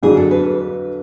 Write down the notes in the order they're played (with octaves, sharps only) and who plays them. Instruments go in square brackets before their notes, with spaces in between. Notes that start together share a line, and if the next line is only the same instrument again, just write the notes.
[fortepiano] F2 D3 F#3 [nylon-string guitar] G#4
[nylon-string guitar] A4
B4